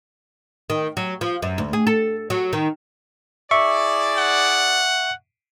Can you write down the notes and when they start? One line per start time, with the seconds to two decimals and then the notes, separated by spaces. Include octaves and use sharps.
0.70 D#3
0.97 F#3
1.21 F3
1.42 F#2
1.58 D2
1.73 G#4
1.87 A4
2.30 F#3
2.53 D#3
3.51 E4 G#4 D5 E5 C#6
4.18 F#5